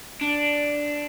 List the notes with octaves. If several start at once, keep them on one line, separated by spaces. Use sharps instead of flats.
D4